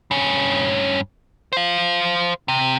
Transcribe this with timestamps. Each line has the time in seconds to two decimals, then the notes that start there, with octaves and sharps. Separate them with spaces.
0.11 G2 C#4
1.53 C5 F5
2.48 C3